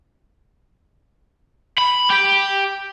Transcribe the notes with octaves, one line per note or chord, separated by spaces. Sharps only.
B5
G4 G5